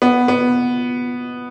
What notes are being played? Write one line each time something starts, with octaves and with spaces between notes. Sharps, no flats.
B3
B3